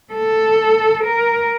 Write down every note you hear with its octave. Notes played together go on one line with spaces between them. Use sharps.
A4
A#4